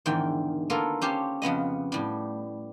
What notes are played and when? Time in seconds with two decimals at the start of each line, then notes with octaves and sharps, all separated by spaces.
0.06 E2 G#2 D3 D#3 G5
0.70 A#3 B3 F4 A4 A#4
1.01 C#4 G4 C5 A5
1.42 F2 C#3 B3 D#5
1.92 A2 G3